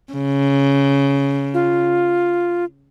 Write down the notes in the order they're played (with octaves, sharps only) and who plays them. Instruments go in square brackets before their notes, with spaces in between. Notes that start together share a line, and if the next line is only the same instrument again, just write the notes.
[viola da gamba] C#3
[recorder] F4